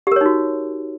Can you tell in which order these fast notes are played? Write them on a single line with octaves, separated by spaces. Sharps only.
G4 A#4 C#5 D#4 F#4